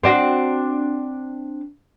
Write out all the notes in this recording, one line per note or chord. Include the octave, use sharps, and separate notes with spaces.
C4 D4 F#4